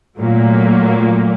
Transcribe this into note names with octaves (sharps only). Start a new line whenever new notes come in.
A#2 F#3 A3 A#3